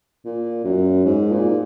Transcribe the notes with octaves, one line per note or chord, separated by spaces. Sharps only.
A#2
F#2
G#2
A#2